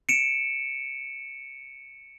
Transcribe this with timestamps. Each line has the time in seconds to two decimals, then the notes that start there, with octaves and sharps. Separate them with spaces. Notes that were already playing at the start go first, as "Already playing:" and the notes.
0.09 C#7 D7 E7